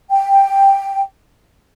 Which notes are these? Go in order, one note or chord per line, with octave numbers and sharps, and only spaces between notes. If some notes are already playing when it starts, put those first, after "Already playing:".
G5